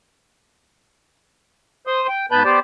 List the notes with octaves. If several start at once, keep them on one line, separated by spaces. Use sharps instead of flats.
C5 C6 D#6
G5
G#2 B3 B4 A5 B5 G6
B3 G4 C5 D5